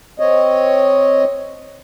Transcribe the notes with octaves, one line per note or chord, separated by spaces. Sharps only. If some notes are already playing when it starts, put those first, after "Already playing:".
C4 C#5 D#5